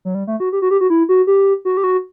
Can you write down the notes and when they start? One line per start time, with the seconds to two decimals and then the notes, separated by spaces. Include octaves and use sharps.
0.05 F#3
0.15 G3
0.27 A3
0.40 F#4
0.52 G4
0.62 F#4
0.71 G4
0.81 F#4
0.90 E4
1.09 F#4
1.27 G4
1.65 F#4
1.77 G4
1.84 F#4